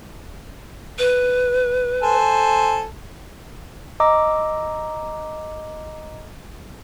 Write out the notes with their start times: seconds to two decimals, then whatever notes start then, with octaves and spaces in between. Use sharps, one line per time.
0.99 B4
2.03 A4 C5 G#5
4.00 D#5 A#5 D6 E6